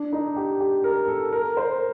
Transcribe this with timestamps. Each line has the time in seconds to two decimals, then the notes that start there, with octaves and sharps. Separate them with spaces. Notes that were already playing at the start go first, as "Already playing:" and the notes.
Already playing: D4
0.13 D#4
0.36 G4
0.60 G4
0.84 A#4
1.08 A4
1.33 A#4
1.57 C5